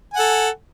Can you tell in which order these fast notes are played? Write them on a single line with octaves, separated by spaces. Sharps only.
G#5 F#5 A4